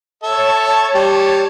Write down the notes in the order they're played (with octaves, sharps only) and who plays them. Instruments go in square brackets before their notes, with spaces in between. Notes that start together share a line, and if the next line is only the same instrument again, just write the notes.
[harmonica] A4 E5 [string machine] C#5 A5
[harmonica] G3 G4